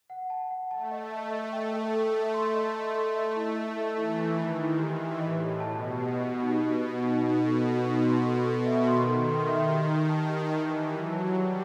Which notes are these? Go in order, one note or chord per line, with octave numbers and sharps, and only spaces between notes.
F#5
A5
F#5
A3 A5
D#5
A5
D#5
G5
A4
A4
A4
C6
D#5
C6
A4
D#5
E4
D#5
A4
E3 E4
E4
D#3 E4
E4
E3 G4
G4
A2 D#5
G4
B2 A5
D#5
G4
G4
D#4
D#5
D#5
D#4
B2 D#4
A4
F#4
D#4
C6
A4
A4
E5
D#3 C6
A4
C6
E5
G4
D#5
A5
G4
E3 D#5
A5
F#3 G4
A5
G3 G4